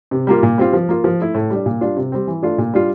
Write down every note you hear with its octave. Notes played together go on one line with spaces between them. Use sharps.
C3
G3 A#3 F4
A#2
G3 C4 F4
F3
A#3 F4
F3
A3 E4
A2
G3 D4
A#2
G3 D4 F4
C3
G3 C4
E3
A3 D4 F4
A#2
G3 D4 F4